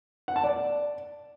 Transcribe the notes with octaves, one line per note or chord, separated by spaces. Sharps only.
F#5
A5
D5